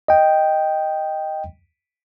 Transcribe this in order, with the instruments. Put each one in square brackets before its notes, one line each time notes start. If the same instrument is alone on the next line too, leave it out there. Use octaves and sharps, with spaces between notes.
[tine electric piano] D#5 G5